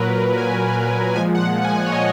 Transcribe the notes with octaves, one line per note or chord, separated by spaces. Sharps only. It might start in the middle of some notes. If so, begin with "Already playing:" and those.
Already playing: A#2 F#3 A#4 B4
G#5
A#2 F3 G#3 G#5
F#5
G#5
F#5
C#5
D#5